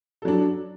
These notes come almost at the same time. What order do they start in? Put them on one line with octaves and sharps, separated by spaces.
A4 F#3 D4